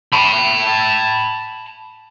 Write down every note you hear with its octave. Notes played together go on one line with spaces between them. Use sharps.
A5 B5